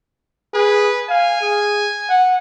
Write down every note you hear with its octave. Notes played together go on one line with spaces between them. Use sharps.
G#4 B4
F5 G#5
G#4
F#5